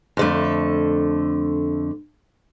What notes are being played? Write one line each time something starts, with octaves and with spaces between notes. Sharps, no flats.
F2 D3 A3